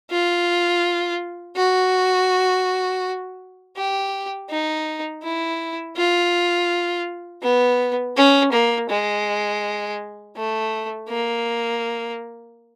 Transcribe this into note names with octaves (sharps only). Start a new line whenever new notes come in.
F4
F#4
G4
D#4
E4
F4
B3
C#4
A#3
G#3
A3
A#3